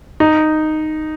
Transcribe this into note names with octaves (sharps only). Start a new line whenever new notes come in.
D#4